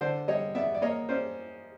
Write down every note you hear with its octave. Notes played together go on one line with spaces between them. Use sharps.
D3 C5 D5
G3 C#5 D#5
B3 D5 E5
D5
A#3 C#5 D#5
C#4 C5 D5